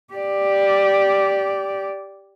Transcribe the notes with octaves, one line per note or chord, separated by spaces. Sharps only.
G4 D5